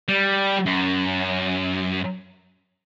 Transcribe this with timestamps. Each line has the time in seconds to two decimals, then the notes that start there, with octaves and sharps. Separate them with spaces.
0.08 G3
0.66 F#2